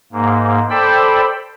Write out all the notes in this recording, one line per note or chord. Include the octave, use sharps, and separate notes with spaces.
G#2 A#3
A4 C5 D5 G5 B5 E6